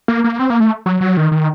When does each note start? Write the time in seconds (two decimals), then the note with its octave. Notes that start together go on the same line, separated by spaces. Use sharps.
0.08 A#3
0.24 A#3
0.39 C4
0.50 A#3
0.60 A3
0.86 F#3
1.01 F#3
1.17 D#3
1.32 D#3